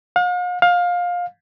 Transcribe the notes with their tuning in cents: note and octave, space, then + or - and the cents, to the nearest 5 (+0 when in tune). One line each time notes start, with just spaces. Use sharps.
F5 +45
F5 +20